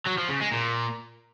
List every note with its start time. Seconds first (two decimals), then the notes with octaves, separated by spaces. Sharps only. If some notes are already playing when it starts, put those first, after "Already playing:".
0.07 F#3
0.18 F3
0.30 C#3
0.42 G#3
0.53 A#2